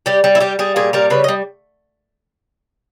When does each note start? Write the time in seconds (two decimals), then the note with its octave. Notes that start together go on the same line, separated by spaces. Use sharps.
0.06 G3 G4
0.24 G3
0.35 E4
0.40 G3 G4
0.59 G3 G#4
0.76 A#2 G#4
0.93 G3 A#4
1.10 C#3 B4
1.24 D#5
1.28 G3